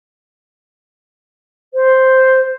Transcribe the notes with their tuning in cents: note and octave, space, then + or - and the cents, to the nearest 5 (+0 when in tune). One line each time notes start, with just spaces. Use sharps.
C5 +0